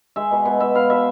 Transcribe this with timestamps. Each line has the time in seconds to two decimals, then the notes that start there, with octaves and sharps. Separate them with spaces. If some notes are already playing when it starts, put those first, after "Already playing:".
0.16 G#3 E5
0.31 B2
0.45 B2
0.60 B2 E5
0.75 B3 F5
0.90 B2 E5